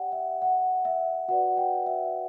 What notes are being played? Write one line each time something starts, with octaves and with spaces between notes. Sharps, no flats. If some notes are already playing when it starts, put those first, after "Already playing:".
Already playing: G4 D5 F#5 G5
E5
F#5
E5
F#4 B4 D5 F#5
G5
E5